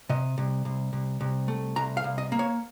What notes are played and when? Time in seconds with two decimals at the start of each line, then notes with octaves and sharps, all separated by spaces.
0.09 C3 D#5
0.38 C2
0.65 C2
0.93 C2
1.21 C2
1.48 A3
1.76 C2 A#5
1.97 F5
2.04 C2
2.18 D#5
2.32 A#3
2.39 C#5